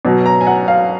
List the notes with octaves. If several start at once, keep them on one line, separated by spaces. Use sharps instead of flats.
B2 F#3
A#5
G#5
F#5
F5